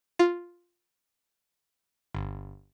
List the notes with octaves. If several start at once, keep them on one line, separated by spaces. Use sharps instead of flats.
F4
G1